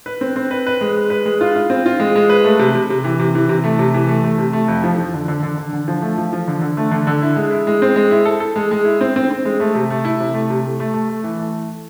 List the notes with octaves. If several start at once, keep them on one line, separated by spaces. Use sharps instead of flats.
B4
C4
C4
B4
B4
G#3
G#3
B4
G#3
F4
F4
C4
F4
G#3
G#3
B4
A3
C3
C3
C3
E3
C3
E3
C3
A3
C3
E3
A3
A3
C3
A3
F2
F3
F3
D3
D3
D3
D3
D3
F3
A3
F3
F3
D3
D3
A3
D3
D3
E4
G#3
E4
G#3
C4
G#3
E4
A4
A4
G#3
G#3
E4
C4
C4
C4
G#3
A3
C3
A3
E4
C3
A3
C3
A3
A3
A3
A3
E3
A3